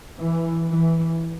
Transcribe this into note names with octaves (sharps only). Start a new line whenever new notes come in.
E3
E3